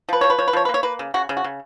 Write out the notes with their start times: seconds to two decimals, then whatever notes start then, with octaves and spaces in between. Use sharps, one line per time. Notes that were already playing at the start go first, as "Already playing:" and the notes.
0.09 F3 B4
0.21 F3 C#5
0.30 B4
0.39 F3 C#5
0.48 B4
0.53 F3 C#5
0.65 B4
0.69 A#3
0.74 C#5
0.83 A#3 B4
0.99 C#3
1.14 C#3 F#4
1.29 C#3
1.37 F#4
1.44 C#3